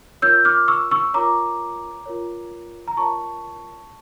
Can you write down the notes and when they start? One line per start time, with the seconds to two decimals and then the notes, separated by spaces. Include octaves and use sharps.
0.22 F4 A#4 C#5 E6 G6
0.45 D6 F6
0.68 C#6 E6
0.91 C#6 E6
1.14 F4 A#4 C#5 A#5 D6
2.06 F4 A#4 C#5
2.88 A#5
2.97 F4 A#4 C#5 A5 C#6